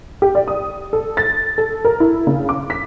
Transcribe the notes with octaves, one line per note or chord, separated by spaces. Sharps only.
G4
D5
D#6
A4
A6
A4
A#4
E4
C#3
D6
B6